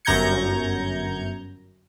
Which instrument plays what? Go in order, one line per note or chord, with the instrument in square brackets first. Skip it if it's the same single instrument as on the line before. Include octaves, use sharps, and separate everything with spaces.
[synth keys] G1 F#2 A#5 G6 G#6 C#7